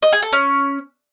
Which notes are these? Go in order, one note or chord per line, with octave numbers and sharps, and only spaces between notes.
D#5
G#4
A4
C#4